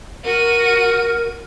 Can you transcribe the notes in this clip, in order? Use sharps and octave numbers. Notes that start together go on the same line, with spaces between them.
F#4 A#4 D#7